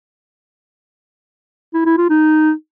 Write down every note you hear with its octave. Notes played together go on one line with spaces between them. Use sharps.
E4
E4
F4
D#4